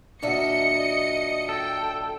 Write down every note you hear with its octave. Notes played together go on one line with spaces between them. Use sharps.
D#2 A#2 F#3 D4 D#5 E5 C#7
A4 G5